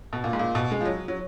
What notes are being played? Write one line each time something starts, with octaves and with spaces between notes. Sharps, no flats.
B2
A#2
G#2
A#2
B2
G#3
F3
F#3
F#3